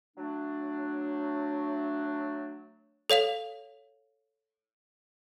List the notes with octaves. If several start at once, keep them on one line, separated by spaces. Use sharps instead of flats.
F#3 A3 D4
A4 C#5 F5 F7